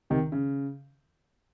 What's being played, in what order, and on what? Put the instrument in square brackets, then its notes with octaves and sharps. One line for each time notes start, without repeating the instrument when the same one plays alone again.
[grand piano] C3 D#3
C#3